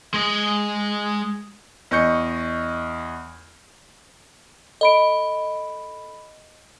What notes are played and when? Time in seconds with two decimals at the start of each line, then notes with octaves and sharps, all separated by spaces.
0.14 G#3 D#5
1.91 E2 D#5 C#6 G6 C#7
4.81 A4 D#5 B5 D7